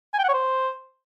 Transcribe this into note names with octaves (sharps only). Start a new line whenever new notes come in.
G#5
G5
F#5
C#5
C5